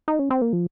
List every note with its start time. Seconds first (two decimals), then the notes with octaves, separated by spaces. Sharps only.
0.08 D#4
0.19 C#4
0.30 C4
0.42 A#3
0.53 F3